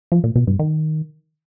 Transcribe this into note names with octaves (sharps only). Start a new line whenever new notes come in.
F3
A#2
B2
G2
D#3